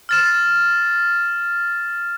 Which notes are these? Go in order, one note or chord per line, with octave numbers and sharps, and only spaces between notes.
F6 A6 E7